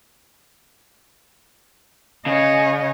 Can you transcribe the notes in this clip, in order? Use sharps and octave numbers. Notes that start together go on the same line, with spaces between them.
C#3 C#5 D#5